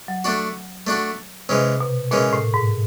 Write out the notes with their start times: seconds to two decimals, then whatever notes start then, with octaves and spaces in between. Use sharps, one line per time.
0.08 F#3
0.24 A3 D4 F#4
0.87 A3 D4 F#4
1.49 C3 E3 G#3 C#4
1.81 B2
2.11 A#2 E3 G#3 C#4
2.33 A2
2.54 G#2